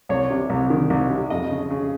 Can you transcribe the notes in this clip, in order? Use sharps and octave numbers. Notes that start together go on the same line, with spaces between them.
C2 C#5
C3
C2
D#3
C2
C3
F2 D#5
C#3
C#3